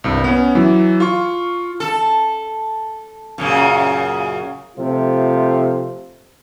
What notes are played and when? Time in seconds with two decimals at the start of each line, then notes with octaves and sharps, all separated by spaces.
0.04 C2 G2
0.24 B3 C#4
0.55 E3 F#3
1.00 F4 C#6
1.80 A4
3.38 F#2 A#2 C#3
4.77 C3 F3 A3 F4